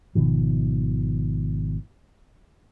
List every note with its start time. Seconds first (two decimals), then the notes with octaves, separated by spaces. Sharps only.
0.15 G#1 B2 D#3 F3